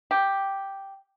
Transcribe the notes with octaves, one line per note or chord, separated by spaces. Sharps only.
G4